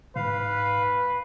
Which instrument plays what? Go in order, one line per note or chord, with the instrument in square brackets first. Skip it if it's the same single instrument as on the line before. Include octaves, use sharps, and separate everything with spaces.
[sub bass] G#2 [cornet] B4 [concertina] F5